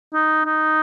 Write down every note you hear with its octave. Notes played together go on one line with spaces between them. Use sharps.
D#4
D#4